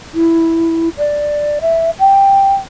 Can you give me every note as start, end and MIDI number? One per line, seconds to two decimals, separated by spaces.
0.14 0.89 64
0.97 1.58 74
1.61 1.90 76
1.99 2.55 79